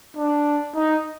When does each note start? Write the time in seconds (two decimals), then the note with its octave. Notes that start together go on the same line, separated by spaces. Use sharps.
0.17 D4
0.75 D#4